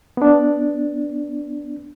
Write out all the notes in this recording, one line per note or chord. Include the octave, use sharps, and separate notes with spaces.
B3 D4